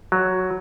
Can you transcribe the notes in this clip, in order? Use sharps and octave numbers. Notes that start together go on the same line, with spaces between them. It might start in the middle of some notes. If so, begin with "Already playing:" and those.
F#3